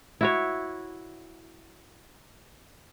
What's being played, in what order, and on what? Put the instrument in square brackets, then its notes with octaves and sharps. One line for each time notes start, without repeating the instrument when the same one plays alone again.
[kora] E4 F#4 C#5